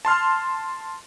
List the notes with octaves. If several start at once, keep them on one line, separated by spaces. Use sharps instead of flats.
A5 C6 F6